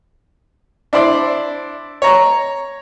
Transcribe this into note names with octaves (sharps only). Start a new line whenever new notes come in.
D4 E4 C5 D5
C#5 A#5